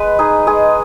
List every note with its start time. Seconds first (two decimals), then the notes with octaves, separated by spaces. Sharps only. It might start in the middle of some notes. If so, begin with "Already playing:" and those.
Already playing: G#3 B4
0.19 D#4 G#4
0.47 G#3 G#4